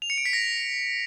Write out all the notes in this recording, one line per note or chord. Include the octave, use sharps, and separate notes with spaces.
F7
C#7
D7
B6
A#6